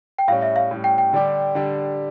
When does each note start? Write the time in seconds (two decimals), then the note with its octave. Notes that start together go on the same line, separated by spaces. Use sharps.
0.18 G5
0.28 A2 G3 C#4 F5
0.42 E5
0.56 F5
0.71 A2 G3 C#4
0.84 G5
0.98 G5
1.13 D3 G3 D4 G4
1.55 D3 G3 D4 G4